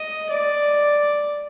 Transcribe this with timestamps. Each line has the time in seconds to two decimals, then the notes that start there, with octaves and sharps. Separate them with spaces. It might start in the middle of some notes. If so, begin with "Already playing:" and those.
Already playing: D#5
0.29 D5